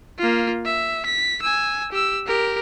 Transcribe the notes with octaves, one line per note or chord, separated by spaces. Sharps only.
A#3 F4
E5
B6
G#5 E6
G4 E6
G4 A#4